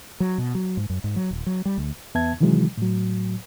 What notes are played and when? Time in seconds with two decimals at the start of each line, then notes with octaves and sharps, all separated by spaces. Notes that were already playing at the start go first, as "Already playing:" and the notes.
0.20 F#3
0.38 B2
0.55 F#3
0.77 G#2
0.90 F#2
1.04 G#2
1.16 F#3
1.31 D#1
1.46 F#3
1.65 G3
1.78 D2
2.15 E2 B3 E5 A5 G#6
2.40 C3 D#3 E3 F#3 G#3
2.77 A2 F#3